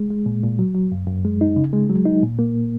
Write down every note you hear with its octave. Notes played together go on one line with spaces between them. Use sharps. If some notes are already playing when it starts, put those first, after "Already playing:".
Already playing: G#3
G#3
A#2
A#2
F#3
F#3
F#2
F#2
G#3
D#4
C#3
G#3
F#3
D#4
A#2
A#3